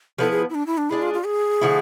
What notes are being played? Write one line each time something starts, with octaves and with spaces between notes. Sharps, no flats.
F3 B3 E4 A4 B4
G#4
E4
D4
E4
D4
G#3 D4 E4 G#4
F4
F4
G#4
D3 F3 A3 E4